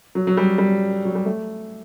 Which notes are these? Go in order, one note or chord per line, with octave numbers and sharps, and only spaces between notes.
F#3
F#3
G3
G3
F#3
G3
A3